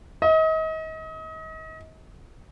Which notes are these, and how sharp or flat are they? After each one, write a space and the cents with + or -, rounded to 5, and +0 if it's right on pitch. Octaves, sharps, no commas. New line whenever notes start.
D#5 +35